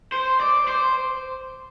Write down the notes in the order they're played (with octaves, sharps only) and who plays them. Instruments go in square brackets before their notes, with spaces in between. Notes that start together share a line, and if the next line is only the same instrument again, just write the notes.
[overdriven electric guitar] C5
D5
C5